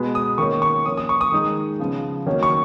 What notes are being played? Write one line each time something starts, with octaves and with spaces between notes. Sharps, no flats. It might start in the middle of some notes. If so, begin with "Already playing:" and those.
Already playing: B2 G#3 B3
D#6
D#3 A#3 C#4 C#6
C#6
F3 A#3 C#4 D#6
D#6
C#6
D#6
D#3 G#3 D#4
C#3 F3 B3
D#3 F#3 A#3 C#4
C#6